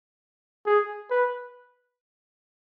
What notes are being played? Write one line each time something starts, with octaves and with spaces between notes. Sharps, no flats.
G#4
B4